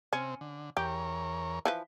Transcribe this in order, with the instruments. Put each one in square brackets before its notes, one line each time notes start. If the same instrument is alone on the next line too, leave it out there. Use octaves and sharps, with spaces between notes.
[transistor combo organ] C3 C4 [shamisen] C#4
[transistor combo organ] D3
[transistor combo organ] E2 A#4 C#5 [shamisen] G4
[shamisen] E3 F3 B4